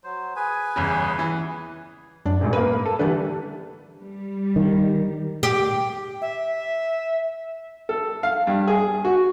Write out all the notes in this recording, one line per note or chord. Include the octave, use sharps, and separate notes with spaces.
F#3 C5
G#4 B4 G#5
G1 E2 C#3
E3
F#2 D4
D#1 G#1
A#3 A#4 B4 D#7
A4
D3 E3 G3 A3 D4 B4
G3
D#3
G4
E5
A4
F5
G2
G#4
F#4